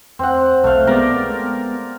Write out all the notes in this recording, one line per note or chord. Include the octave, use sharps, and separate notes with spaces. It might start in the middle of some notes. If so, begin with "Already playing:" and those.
E2 C4 F#5
B1 A3 F5
G#3 B3 A#4 D5